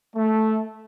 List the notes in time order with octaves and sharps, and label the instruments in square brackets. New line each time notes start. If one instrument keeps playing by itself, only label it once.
[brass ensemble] A3